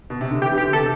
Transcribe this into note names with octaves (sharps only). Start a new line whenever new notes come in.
B2
C3
D3
E3 G4
E3
G4
D3
C3 A4